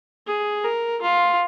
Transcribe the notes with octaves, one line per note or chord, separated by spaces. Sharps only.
G#4
A#4
F4